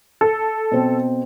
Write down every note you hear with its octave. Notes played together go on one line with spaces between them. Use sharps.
A4
B2 C4